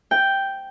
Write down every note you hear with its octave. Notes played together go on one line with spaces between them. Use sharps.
G5